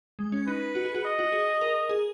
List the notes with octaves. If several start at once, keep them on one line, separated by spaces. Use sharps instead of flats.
G#3
C#4
D#4 B4
F#4
G#4
F#4
D#5
F#4
G#4
A#4
G#4